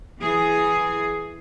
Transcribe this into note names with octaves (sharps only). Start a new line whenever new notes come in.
E3 G#4